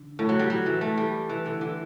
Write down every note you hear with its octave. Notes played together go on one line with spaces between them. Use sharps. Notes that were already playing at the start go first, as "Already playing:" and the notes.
Already playing: D3
A2
F#3
G3
F#3
E3
A3
G3
E3
D3
E3